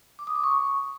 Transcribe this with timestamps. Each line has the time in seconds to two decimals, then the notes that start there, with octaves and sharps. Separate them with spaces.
0.19 D6
0.27 D#6
0.35 D6
0.44 C#6